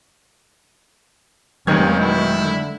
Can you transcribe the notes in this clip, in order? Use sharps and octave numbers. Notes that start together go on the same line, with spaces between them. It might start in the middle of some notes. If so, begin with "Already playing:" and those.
F1 C3 D#3 F#3 G#3 A#3 C#4 G#6
B2 E4
D3